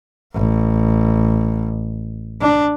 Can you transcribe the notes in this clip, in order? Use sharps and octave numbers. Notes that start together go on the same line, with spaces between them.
A1
D4